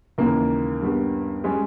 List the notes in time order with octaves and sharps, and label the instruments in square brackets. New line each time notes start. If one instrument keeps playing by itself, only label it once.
[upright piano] D#2 C#3 E3 G#3 [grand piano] A#3
[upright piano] G2 G3 B3 G4
[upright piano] G3 C#4 G4 [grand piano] G#3